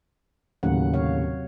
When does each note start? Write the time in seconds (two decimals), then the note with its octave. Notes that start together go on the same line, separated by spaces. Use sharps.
0.63 D#2 A2 C#3 F#3 F#5
0.94 C3 C#5 F5